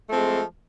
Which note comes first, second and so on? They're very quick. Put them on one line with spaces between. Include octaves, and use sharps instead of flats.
A3 F3 C4 G#3